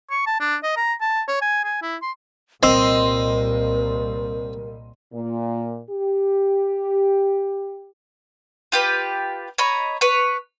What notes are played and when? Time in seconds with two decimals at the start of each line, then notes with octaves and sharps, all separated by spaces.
0.11 C#6
0.26 A5
0.40 D4
0.63 D#5
0.76 A#5
1.01 A5
1.28 C#5
1.41 G#5
1.64 G#5
1.82 E4
2.02 C6
2.63 C2 A#2 G3 C4 A#4 D#5 C6 E6
5.13 A#2
5.90 G4
8.72 F4 G4 B4
9.58 C#5 D#5 A#5 B5
10.01 B4 C#5